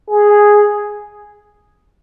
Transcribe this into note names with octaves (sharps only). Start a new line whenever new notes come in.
G#4